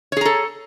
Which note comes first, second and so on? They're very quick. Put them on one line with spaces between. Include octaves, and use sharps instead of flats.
C#5 G#4 A#5 A4